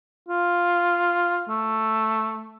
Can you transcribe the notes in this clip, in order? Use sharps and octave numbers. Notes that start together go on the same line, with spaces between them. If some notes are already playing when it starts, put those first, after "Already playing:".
F4
A3